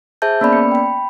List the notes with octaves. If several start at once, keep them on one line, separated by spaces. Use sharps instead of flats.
G#4 C5 E5 A5 G6
A#3 B3 C#4 D5 B5
C#7
G5 B5